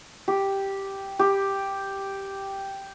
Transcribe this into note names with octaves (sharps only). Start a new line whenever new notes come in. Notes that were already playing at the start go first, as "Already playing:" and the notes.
G4
G4